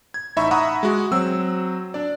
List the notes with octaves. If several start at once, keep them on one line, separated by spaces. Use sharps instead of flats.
G#6
A1 D#4 E5 B5 C#6
E5 F#5 A#5 B5 C#6 D#6
G#3 F#4
F#3 C4 E6
D4 D5